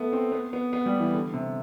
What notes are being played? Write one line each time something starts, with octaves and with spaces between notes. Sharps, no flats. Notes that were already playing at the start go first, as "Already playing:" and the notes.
Already playing: A3 B3
C4
B3
B3
B3
G3
E3
D3
C3